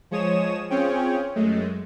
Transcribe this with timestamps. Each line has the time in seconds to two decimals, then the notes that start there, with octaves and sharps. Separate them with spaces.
0.11 F3 G#3 C#5 D#6 E7
0.70 C4 C#4 F4 G#4 C#5 G5
1.35 F#2 G#3 A3